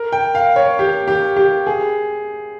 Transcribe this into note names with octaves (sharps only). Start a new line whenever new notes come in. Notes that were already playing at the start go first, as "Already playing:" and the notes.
Already playing: A#4
G5
F5
C#5
G4
G4
G4
G#4